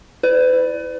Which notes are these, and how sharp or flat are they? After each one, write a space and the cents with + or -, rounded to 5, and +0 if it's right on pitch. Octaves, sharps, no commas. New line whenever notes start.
E4 -5 B4 +40 D5 +0